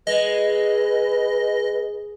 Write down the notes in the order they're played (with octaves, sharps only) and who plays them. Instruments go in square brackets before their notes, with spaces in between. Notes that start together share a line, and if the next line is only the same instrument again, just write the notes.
[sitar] G#3 [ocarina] B4 [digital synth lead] D#5